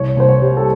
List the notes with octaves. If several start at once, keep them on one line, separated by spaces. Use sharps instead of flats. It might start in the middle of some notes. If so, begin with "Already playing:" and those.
Already playing: C2 C#5
C2 C5
C#5
G3
A4